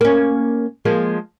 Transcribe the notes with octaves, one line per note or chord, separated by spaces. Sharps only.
A#3 C#4
F3 G#3 A#3